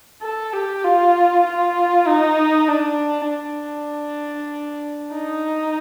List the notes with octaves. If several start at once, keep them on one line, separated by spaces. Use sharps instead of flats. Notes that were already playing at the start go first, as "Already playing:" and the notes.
A4
G4
F4
F4
D#4
D4
D4
D#4